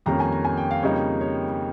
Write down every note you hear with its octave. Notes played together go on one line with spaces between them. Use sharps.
F2 D#3 G3 A#3 C#4 A#5
G#5
A#5
G#5
G5
F5
F2 C#3 G3 A#3 D#4 C#5
C#5